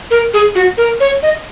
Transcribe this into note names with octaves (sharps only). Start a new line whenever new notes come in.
A#4
G#4
F#4
A#4
C#5
D#5